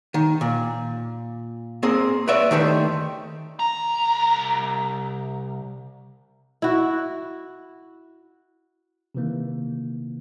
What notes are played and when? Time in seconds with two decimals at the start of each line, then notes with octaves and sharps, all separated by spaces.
0.14 D#3
0.41 A#2
1.83 A#3 C4 G#4
2.28 B4 C#5 D5 E5
2.51 D#3 A3 G4 C5
3.59 C2 A#5
6.62 E4 F#4
9.15 C3 D#3 E3 A#3